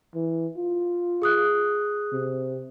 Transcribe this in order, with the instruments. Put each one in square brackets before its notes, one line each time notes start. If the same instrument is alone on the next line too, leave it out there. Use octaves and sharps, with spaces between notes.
[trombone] E3
F4
[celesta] G#4 D#6 F#6
[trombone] C3